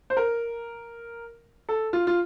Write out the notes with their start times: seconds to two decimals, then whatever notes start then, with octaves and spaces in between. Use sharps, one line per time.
0.10 C5
0.17 A#4
1.69 A4
1.93 F4
2.07 F4